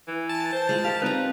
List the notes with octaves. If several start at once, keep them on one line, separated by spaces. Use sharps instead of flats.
E3
A5
C5
G#3 F4
G4 A#4 F5
C4 D#4 B4 D5 A#5